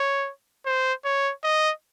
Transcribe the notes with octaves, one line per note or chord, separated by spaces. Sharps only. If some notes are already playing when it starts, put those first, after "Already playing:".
Already playing: C#5
C5
C#5
D#5